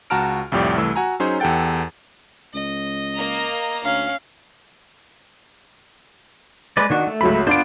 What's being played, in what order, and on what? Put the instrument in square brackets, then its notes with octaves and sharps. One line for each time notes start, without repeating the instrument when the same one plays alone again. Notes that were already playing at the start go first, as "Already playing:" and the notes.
[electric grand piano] C#2 F#4 A5 A#5 F6 D7
C2 F2 A2 G4 D5
C2 E3 A3 E6
F#4 G#5 A#5
F#3 C#4 D#4 G#4 C5
E2 G4 A4 F#5 G5 A6
[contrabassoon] C#2 [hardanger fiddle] D#5
[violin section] A#3 A#5
[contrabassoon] D2 [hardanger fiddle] C#4 [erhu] F5
[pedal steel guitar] G#3 B4 D5
D#3 D4 F#4
A3
[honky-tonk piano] C#2 F#3 B5
[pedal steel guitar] B3 F4 C5 [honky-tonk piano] D4 D7